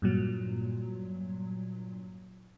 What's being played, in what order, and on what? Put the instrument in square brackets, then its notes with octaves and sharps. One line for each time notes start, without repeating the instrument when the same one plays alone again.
[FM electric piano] G2 A#2 F#3